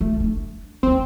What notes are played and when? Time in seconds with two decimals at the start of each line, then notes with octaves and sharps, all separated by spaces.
0.01 A3
0.20 C#4 D4
0.83 D2 D3 C4